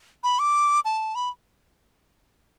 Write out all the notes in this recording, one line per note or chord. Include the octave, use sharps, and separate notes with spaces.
B5
D6
A5
B5